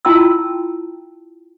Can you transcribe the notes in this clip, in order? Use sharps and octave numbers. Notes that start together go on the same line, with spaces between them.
E4 F4 G5 A5 C6 E6